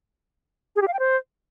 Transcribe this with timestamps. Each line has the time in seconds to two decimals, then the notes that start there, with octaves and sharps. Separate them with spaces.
0.76 G#4
0.82 G4
0.87 F5
0.93 G5
0.99 C5